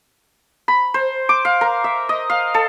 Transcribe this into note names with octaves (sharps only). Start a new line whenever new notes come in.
B5
C5
D6
F5
A#4
E5
D#5
F5
A4